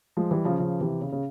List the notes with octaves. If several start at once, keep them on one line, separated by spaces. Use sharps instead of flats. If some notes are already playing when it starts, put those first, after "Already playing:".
F3 G#3
E3 G3
C#3 F3
C#3 F3
C3 E3
C#3
C#3